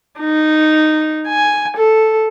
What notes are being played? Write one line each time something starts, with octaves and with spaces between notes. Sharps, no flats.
D#4
G#5
A4